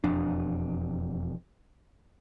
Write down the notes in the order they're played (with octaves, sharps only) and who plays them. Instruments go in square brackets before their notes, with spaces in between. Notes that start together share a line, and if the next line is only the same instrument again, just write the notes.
[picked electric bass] E1 F2 D4